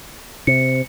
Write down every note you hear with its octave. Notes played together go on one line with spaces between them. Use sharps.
C3 C#7